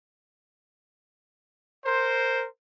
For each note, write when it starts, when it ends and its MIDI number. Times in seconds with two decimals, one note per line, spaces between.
1.86 2.46 70
1.86 2.46 72